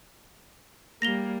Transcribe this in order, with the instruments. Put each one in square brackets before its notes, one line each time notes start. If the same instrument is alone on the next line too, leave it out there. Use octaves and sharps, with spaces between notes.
[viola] G3 A#3 [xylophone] A#6 F7 G7